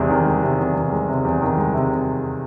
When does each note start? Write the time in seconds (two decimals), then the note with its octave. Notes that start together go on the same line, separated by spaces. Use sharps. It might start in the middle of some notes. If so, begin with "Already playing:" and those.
Already playing: E2 C3 G#3
0.10 D#3
0.25 G#3
0.43 C3
0.59 E2
0.76 D#3
0.92 G#3
1.08 C3
1.25 E2
1.42 D#3
1.58 G#3
1.74 C3